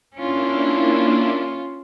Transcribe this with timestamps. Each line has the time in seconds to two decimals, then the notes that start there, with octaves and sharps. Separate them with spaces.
0.15 A#3 C#4 D4 E4 F4